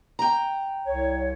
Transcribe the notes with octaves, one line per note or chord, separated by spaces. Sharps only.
G5 A#5
C2 C#5